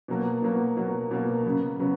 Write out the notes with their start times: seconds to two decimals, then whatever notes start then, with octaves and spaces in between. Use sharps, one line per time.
0.08 B2 F#3 A#3
0.42 B2 F#3 A#3
0.77 B2 F#3 A#3
1.11 B2 F#3 A#3
1.44 C#3 F#3 B3
1.80 C#3 F#3 B3